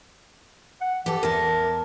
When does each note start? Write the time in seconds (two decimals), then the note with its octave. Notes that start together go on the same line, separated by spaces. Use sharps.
0.81 F#5
1.06 E3 G4 A4
1.23 E2 A#4 A5